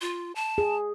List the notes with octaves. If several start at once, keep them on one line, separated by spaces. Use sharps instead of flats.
F4
A5
G#4